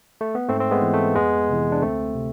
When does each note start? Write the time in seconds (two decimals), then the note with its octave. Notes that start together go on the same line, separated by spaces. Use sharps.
0.21 A3
0.35 B3
0.48 G#2 A3 C4
0.60 C4
0.71 G#3 B3
0.82 E3
0.93 A3
1.15 F2 G#3 B3
1.49 C3 E3
1.72 D4
1.82 D2 A3 C4
2.15 C3